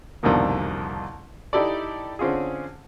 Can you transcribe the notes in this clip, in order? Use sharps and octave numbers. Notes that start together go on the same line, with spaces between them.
C2 F2 B2 D3 D#3 A#3
D#4 E4 G4 A4 D5
D3 C4 C#4 F4 G#4